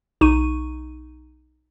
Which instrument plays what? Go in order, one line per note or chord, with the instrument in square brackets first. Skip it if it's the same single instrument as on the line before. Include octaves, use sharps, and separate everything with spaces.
[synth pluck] B1 D#4 C#6 D#7